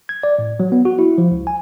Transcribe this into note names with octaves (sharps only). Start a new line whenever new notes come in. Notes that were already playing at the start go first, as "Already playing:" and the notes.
G#6
D5
A2
F#3
B3
F#4
E4
F3
C#2
G#5